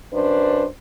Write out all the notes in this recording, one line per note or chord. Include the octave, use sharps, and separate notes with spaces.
F#2 D4 B4 C5